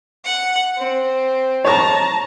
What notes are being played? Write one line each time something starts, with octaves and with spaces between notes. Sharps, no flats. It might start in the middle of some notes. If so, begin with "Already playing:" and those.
F#5
C4
C#5 A5 A#5 C#6